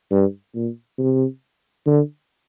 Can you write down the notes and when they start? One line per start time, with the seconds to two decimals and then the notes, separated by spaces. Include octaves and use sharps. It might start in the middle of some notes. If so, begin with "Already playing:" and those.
0.11 G2
0.55 A#2
0.99 C3
1.87 D3